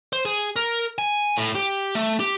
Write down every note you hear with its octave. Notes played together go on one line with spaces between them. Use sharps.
C5
G#4
A#4
G#5
A2
G4
A3
G4